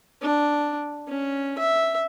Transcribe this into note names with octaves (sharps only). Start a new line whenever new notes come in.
D4
C#4
E5